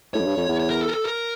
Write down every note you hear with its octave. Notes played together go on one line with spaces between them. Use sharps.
A2 C#5
F2
G2
F2
E2
C#5
A#4
A4
A#4
A4
A#4